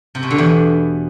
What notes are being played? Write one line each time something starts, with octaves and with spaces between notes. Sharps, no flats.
C3
B2
D3
E2